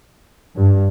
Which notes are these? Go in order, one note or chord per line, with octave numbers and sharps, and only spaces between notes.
G2